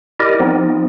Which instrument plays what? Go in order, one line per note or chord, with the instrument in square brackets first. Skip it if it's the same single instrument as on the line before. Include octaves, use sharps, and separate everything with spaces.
[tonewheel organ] E4 G4 A#4 D5 D#5
F3 B3 C4 D#4